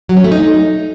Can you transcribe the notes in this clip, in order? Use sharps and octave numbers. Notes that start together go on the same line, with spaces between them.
F#3
C#4
A3
D#4